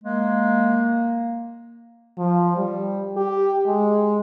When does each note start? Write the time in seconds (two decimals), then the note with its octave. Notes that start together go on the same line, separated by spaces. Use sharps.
0.04 G#3 A#3
2.18 F3
2.57 G3
3.17 G4
3.67 G#3